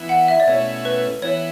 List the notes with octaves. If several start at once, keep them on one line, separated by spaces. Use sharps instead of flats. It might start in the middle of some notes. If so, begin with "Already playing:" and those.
Already playing: E3 B3 E4
F#5
E5
D5
B2 A3 C#4 E4 C#5
B4
E3 B3 E4 C#5